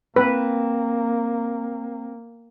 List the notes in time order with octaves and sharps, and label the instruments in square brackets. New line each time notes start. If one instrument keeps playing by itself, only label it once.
[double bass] A#3 [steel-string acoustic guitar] C4 [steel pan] B4